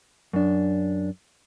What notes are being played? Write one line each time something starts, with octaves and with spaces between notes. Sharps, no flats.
F#2 D4